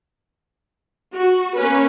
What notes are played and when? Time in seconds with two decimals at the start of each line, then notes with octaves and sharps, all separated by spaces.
1.15 F#4
1.57 A#3 C#4 B4